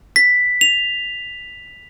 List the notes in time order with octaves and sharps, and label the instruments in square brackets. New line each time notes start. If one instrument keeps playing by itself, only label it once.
[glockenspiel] B6
F7